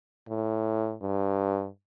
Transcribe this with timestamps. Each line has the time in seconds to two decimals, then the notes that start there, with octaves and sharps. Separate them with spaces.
0.29 A2
1.02 G2